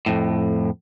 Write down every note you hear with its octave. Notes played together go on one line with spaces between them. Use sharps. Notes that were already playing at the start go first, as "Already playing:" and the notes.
F2 A2